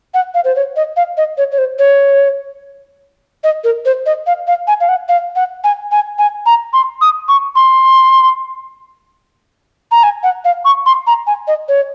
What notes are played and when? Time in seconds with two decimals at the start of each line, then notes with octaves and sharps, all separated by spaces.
0.14 F#5
0.34 F5
0.45 C5
0.56 C#5
0.76 D#5
0.97 F5
1.17 D#5
1.38 C#5
1.52 C#5
1.58 C5
1.79 C#5
3.44 D#5
3.64 A#4
3.85 C5
4.06 D#5
4.27 F5
4.47 F5
4.67 G#5
4.81 F5
4.89 F#5
5.09 F5
5.36 F#5
5.64 G#5
5.92 G#5
6.19 G#5
6.46 A#5
6.73 C6
7.01 D#6
7.29 C#6
7.56 C6
9.91 A#5
10.03 G#5
10.23 F#5
10.45 F5
10.65 C#6
10.86 C6
11.07 A#5
11.27 G#5
11.48 D#5
11.68 C#5